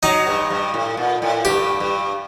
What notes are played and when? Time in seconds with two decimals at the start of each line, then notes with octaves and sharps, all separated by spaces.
0.03 F#3 D#4
0.27 G2
0.50 G2
0.74 A2
0.97 A#2
1.22 A2
1.45 G2 G4
1.80 G2